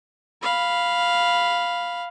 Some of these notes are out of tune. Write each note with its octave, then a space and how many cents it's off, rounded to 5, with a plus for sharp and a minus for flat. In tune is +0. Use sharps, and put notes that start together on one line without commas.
F5 +0 B5 +0